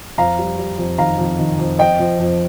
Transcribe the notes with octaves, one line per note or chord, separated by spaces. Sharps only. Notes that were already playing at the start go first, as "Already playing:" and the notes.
F2 F5 A#5
G3
G3
F2
D#3 F5 A#5
F2
D#3
F2
F2 D#5 G5
F3
F2